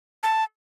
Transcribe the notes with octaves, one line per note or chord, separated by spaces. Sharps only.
A5